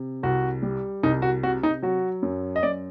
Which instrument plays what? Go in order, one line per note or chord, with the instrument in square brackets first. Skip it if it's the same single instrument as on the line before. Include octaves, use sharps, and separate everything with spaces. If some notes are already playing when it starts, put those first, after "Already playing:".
Already playing: [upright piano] C3
C2 F#4
G3
C2 D#4
F#4
C3 F#4
D#4
F#3 F#4
F#2
D#5
F#2 D5